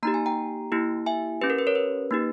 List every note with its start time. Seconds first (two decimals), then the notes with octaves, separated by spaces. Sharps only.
0.03 A#3 D#4 G4 A#5
0.14 G#5
0.26 G5 A#5
0.72 A#3 E4 G4
1.06 E5 G#5
1.41 C#4 G4 B4
1.50 A#4
1.59 B4
1.67 A#4 C#5
1.75 B4
2.11 A#3 D#4 G4